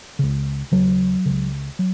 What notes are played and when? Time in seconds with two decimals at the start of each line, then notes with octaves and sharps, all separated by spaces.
0.19 C#2 C#3
0.72 D#2 C#3 F#3
1.26 C#2 C#3
1.79 F#3